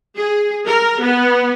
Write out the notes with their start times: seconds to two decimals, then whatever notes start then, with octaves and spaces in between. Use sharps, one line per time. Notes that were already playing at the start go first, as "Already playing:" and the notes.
0.17 G#4
0.65 A#4
1.00 B3